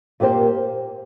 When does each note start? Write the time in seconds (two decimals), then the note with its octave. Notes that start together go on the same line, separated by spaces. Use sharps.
0.20 A#2 A#3 G4 C5